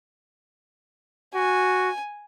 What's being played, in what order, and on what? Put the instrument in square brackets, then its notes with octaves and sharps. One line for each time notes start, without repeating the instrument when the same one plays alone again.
[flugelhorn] F#4 [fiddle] G#5